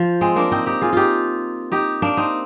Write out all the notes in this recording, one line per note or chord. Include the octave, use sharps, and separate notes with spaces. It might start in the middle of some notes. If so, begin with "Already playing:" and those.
Already playing: F3
G#3 C4
A#3 D4
C4 D#4
D#4 G4
F4 G#4
D#4 F4 G4
D#4 G4
A#3 D4
C4 D#4